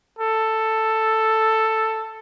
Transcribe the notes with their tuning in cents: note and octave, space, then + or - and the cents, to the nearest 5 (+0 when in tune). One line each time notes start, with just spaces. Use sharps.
A4 +5